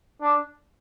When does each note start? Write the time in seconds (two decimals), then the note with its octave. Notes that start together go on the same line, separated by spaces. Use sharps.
0.22 D4